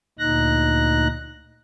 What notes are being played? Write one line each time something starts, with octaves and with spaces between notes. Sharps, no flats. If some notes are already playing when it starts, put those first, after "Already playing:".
D2 A#2 D#4 F#6 A#6